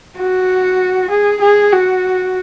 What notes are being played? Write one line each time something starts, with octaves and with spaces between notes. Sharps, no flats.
F#4
G#4
G#4
F#4